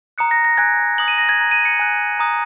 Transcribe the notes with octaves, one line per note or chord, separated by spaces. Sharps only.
A#5 D#6 F#6 C#7
A#6
A#6
G#5 F#6 G#6
A#5 D#6 F#6 F#7
D#7
A#6
G#6
A#5 F#6
D#7
C#7
G#5 F#6
A#5 D#6 F#6